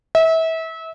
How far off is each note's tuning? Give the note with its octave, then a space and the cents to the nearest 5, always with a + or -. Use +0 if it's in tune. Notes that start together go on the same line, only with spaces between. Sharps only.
E5 -30